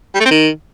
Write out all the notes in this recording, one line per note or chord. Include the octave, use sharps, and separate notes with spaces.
G3
A3
C4
D#3